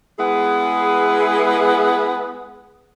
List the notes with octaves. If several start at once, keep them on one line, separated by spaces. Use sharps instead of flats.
G#3 B3 E4 G#4 B4